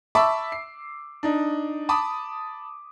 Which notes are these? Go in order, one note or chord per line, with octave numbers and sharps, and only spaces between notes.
E5 A5 B5 C#6 D6 E6
C7
D4 D#4
A5 B5 D6 D#6